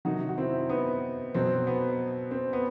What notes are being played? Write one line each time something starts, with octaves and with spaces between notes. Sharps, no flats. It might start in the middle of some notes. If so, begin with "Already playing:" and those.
C3 D#3 F#3 D#4 F#4
F#4
C4 E4
B3 D#4
B2 F#3 C4
B3
C4
B3